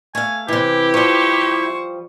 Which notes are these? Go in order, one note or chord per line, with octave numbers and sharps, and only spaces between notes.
A3 F5 G#5
C3 E3 E4 G4
F3 G3 C5 C#6